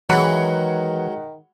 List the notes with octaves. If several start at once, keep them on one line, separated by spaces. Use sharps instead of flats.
D#3 E3 F#3 G#3 F#5 B5